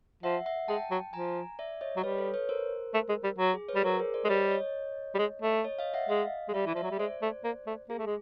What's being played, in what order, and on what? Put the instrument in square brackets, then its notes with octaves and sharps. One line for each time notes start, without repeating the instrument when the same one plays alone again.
[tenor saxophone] F3 [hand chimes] E5 F#5
[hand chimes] E5 F#5
[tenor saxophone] G#3 [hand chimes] G5 A5
[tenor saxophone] F#3
[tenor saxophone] F3 [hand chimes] G#5 A#5
[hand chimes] D5 E5
C#5 D#5
[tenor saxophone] F#3
[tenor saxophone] G3 [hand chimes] B4 C#5
[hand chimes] A4 B4
B4 C#5
A#4 C5
[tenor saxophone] A3
G#3
G3
F#3
[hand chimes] G#4
B4 C#5
[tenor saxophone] G3
[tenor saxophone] F#3 [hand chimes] A#4 C5
[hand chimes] G#4 A#4
C5 D5
[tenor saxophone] G#3
[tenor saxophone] G3 [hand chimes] C#5 D#5
[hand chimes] C#5 D#5
[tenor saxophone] G3
G#3
A3
[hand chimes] C#5 D#5
D#5 F5
E5 F#5
[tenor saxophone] G#3 [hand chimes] D#5 F5
[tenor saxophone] G#3
[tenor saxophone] G3 [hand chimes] D5 E5
[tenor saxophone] E3
[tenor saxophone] F3 [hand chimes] D5 E5
[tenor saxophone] F#3
G3
[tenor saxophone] G#3 [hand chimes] C5 D5
[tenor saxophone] A3
A#3
A3
[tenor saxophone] A#3 [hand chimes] G#4
[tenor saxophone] A3
G#3